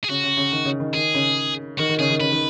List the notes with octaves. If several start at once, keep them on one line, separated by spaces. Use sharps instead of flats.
G#4
C#3 F#4
C#3
C#3
D#3
C#3
D#3
D#3 G#4
C#3
D#3 F#4
D#3
C#3 G#4
D#3
C#3 B4
D#3